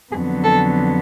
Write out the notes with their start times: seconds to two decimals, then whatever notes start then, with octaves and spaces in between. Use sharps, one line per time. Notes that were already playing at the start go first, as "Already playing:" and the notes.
0.11 F2 D3 F#3 B3 G#4
0.43 A4